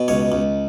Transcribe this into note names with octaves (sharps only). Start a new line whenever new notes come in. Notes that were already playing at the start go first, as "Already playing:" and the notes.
Already playing: B2
C#2 C#5
C#2